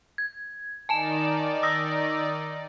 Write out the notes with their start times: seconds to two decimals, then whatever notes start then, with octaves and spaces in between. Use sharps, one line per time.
0.18 G#6
0.89 D#3 D#4 D5 G#5 A5 E7
1.63 D#6 E6 A#6